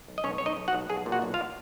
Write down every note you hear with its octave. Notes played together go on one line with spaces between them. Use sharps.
B1
D#5
B1 C#4 C#5
B1 C#5
D#4 D#5
B1
F#4 F#5
B1
B1 G#4 G#5
A#2
F#4 F#5
B1
F4 F5